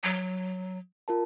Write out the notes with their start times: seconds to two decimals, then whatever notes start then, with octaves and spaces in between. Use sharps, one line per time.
0.04 F#3
1.08 F4 A#4 A5